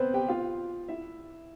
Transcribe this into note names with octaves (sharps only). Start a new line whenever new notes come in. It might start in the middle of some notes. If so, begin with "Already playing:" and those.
Already playing: B3 C4 B4 C5
G4 G5
F4 F5
E4 E5